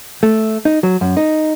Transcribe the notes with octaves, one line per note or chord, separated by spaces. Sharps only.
A3
D#4
F#3
F#2
D#4